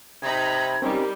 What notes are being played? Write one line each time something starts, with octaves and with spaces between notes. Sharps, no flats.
C3 D#4 A#5 B5 G#6
G3 C4 C#4 D#4 A#4